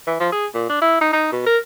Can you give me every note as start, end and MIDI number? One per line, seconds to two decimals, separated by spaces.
0.07 0.16 52
0.20 0.28 53
0.32 0.46 68
0.54 0.66 46
0.69 0.80 62
0.82 1.00 64
1.01 1.12 63
1.13 1.28 63
1.32 1.43 47
1.46 1.58 70